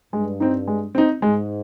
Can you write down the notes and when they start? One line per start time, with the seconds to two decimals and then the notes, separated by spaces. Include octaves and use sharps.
0.13 G2 G#3
0.40 C4 D#4
0.67 G#3
0.95 C4 D#4
1.22 G#2 G#3